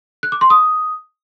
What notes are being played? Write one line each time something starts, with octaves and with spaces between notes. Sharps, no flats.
F#6
D6
C6
D#6